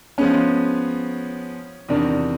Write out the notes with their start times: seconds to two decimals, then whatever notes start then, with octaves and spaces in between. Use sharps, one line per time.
0.18 F3 G#3 B3 C#4
1.89 E2 C3 D#3 D4